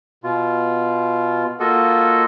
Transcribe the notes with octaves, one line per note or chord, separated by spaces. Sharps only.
B2 F4
A#3 F4 F#4 A4 D#5